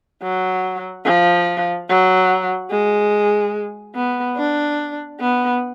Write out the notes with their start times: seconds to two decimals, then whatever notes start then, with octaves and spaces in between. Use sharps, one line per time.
0.23 F#3
1.05 F3
1.89 F#3
2.70 G#3
3.95 B3
4.37 D4
5.20 B3